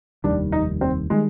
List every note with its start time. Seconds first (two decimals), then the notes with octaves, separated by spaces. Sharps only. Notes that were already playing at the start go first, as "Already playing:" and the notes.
0.24 F1 D#2 D#3 G3 D4
0.52 D#4
0.81 C4
1.10 D#3 G3 G#3